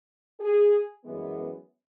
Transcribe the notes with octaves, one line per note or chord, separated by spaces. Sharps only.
G#4
F#2 E3 G#3 B3